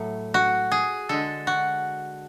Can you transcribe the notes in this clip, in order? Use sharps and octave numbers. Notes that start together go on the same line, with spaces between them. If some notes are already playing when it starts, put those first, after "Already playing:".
Already playing: A2 F#3 A3
F#4
G#4
D3 G#3 A4
F#4